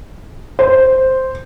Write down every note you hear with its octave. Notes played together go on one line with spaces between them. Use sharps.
C5